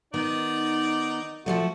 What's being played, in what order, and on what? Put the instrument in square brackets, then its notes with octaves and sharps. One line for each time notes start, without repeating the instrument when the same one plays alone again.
[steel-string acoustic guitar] D#3 B3 [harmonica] D#4 D5
[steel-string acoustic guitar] F3 F#3 A3 [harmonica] F#4